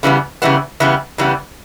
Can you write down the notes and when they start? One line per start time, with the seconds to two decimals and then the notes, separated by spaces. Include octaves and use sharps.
0.03 C#3 E3 G3 B3
0.42 C#3 E3 G3 B3
0.80 C#3 E3 G3 B3
1.18 C#3 E3 G3 B3